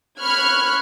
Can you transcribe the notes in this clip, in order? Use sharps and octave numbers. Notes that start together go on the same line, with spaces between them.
B5 C#6 F6 F#6 G#6